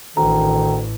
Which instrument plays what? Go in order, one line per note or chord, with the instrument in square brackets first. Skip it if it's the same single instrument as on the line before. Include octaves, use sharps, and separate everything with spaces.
[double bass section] A1 A2 E3 [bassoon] D2 [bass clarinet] D#3 [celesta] A#5